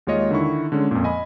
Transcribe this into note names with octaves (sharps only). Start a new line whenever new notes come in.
D#2 G#3 F4 C#5 D#5
D3 D#3 E4 C#6
D3 G#3 C#4
F2 A#2
D#5 G#5 B5